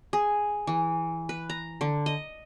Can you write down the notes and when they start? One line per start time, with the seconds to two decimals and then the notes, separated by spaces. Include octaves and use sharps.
0.13 G#4
0.67 E3
1.29 B4
1.50 A#5
1.81 D3
2.06 D#5